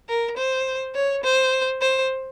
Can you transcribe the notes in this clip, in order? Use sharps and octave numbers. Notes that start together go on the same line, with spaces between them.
A#4
C5
C#5
C5
C5